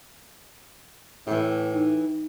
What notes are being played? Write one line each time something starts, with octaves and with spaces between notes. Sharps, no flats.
A2 E3 G4
D#4